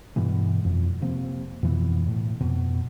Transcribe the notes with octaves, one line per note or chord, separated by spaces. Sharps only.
G2 B2 E3 G#3
F2
C3 F3 A#3 C4
F2 B2 E3
A2
F2 B2